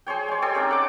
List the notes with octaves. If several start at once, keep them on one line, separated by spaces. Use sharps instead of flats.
G#4 C5 C#5 G5
G#3 C#5
G4 A4 G5 C6
C4 C#4 D#4
F#5 D6